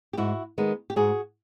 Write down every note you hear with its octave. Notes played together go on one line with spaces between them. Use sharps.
G4
G#2 E4 F#4
D#3 G#3 B3
G4
G#2 F#4 G#4